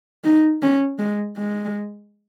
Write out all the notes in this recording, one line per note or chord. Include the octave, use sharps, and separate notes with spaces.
D#4
C#4
G#3
G#3